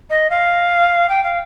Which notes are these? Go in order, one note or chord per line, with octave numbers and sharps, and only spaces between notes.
D#5
F5
G5
F5